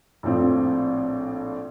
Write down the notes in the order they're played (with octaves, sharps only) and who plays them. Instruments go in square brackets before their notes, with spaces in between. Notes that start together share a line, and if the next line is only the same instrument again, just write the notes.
[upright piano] A#1 A2 F3 C4